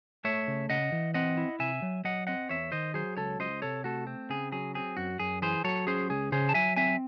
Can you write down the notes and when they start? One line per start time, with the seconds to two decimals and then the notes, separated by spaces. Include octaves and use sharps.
0.24 A3 C#5 E5
0.47 C#3
0.70 C#3 D#5 F#5
0.92 E3
1.14 C4 D#5 F#5
1.37 E4
1.59 C3 E5 G#5
1.82 F#3
2.04 F#3 D#5 F#5
2.27 C4 D#5 F#5
2.49 E2 C#5 E5
2.72 D#3 C5 D#5
2.94 F#3 G#4 C5
3.17 C#2 A4 C#5
3.39 C#2 C5 D#5
3.62 C3 A4 C#5
3.84 A3 F#4 A4
4.07 C4
4.29 C#3 G#4
4.52 F#3 G#4
4.75 C4 G#4
4.97 F#2 F#4
5.20 F#2 G#4
5.42 E3 G#4 C5
5.64 F#3 A4 C#5
5.87 C#4 G#4 C5
6.10 C#2 G#4
6.32 C#3 G#4 C5
6.49 A5
6.54 F#3 E5 G#5
6.76 C4 E5 G#5